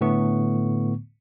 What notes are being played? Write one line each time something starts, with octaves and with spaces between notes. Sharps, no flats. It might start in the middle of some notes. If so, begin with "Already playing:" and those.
A2 D3 A3 B3 C#6